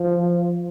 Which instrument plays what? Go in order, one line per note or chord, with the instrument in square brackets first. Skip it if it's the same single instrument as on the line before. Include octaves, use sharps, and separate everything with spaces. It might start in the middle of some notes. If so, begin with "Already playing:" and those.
Already playing: [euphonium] F3